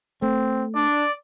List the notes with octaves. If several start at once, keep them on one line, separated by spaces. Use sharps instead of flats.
A3 C4
D4 D5